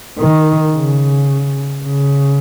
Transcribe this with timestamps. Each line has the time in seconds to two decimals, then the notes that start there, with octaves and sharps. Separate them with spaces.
0.19 D#3
0.74 C#3
1.84 C#3